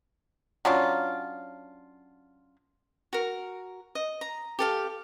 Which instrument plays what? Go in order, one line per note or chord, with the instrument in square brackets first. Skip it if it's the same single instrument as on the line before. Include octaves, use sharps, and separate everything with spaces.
[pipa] F#3 C#4 D4 F4
[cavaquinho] F#4 A#4
D#5
A#5
G4 A4 F5